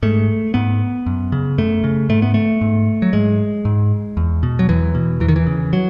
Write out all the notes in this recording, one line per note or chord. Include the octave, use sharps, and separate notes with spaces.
G#2 A3
G#2 B3
F#2
C#3
F#2 A3
C#3
G#2 A3
B3
A3
G#2
F#3
G#2 G#3
G#2
E2
B2
F#3
E2 E3
B2
E2 E3
D#3
E3
C#3
F#3